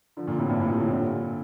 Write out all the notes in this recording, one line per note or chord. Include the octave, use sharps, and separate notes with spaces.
D3 F3
A#2 D3
A2 C3
G2 A#2
A2
A2 C3
A2 C3
A#2 D3